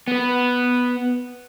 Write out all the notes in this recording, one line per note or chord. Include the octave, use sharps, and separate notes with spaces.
B3 B4